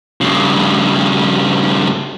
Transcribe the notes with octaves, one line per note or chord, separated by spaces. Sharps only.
G2 C#3